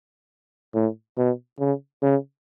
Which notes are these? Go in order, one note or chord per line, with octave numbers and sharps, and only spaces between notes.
A2
B2
C#3
C#3